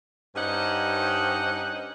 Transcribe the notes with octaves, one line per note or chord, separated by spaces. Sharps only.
G2 C#4 D#4 G4 C5 F#5